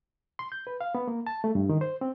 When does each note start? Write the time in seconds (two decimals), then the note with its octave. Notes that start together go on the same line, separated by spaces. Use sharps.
0.39 C6
0.52 G6
0.67 B4
0.81 F5
0.95 B3
1.08 A#3
1.27 A5
1.44 A3
1.55 G2
1.69 D#3
1.81 C5
2.01 C4